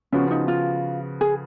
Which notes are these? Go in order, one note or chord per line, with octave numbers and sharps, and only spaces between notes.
C#3 F3 B3 C#4 F#4
D#4
F4
G#4